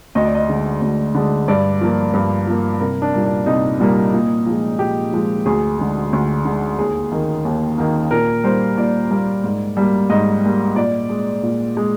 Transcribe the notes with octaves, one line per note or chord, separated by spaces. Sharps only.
D2 D#5
D5
D#5
D3 G#3
D2
D3 G#3
G2 D5
F3 A#3
G2
F3 A#3
C2 A#4
D4
A#2 G3 A#3
D4
C2 D#4
A#2 G3 A#3
A#2
F3 G#3
A#2 G4
F3 G#3
D2 G#4
D3 G#3
D2
D3 G#3
D#2 G#4
D#3 A#3
D#2
D#3 A#3
A#2 A#4
G3 A#3 C5
A#2 D5
G3 A#3
G#2
G3 A#3
G#2 D#5
G3 A#3
A#2 D5
G#3
A#2
G#3